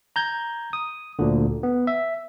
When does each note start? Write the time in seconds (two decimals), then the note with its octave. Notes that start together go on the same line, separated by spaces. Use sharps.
0.16 A#5 G6 G#6
0.73 D#6
1.19 D2 A#2 D3
1.63 B3
1.87 E5